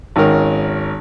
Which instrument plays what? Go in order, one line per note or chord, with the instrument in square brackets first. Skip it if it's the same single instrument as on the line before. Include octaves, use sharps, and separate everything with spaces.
[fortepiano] G#1 D#3 C#4 A#4